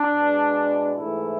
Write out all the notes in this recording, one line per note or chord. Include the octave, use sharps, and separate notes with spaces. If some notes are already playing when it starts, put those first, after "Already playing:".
Already playing: D4
B2 G#3
G#2 E3 A3 E4